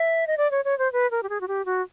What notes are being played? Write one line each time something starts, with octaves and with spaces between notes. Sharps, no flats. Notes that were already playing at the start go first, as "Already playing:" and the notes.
Already playing: E5
D#5
D5
C#5
C#5
C5
B4
A#4
G4
G#4
F#4
G4
F#4